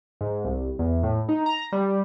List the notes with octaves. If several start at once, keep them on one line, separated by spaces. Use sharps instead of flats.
G#2
C2
E2
A2
D#4
A#5
G3